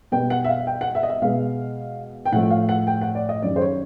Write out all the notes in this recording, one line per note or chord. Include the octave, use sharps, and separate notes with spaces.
B2 G3 B3 G5
F#5
E5
F5
G5
F#5
E5
D#5
E5
B2 G#3 B3 F5
G5
A2 F3 A3 F#5
F5
F#5
G5
F#5
D5
D#5
F#2 D#3 G3 D5
C5
C#5